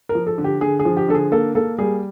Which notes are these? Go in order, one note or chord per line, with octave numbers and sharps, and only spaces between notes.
A#4
F3
A4
D3
G4
D3 G#4
G#4
F3
G4
D3 A4
G#4
A#3 A4
A#3 A4
G3 G#4